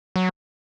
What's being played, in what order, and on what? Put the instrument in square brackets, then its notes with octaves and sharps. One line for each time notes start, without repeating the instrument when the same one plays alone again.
[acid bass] F#3